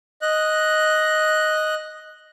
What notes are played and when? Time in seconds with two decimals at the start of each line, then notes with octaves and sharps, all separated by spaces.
0.22 D#5 F#6